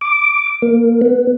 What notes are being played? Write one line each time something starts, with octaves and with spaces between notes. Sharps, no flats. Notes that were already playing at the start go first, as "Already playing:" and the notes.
D6
A#3
B3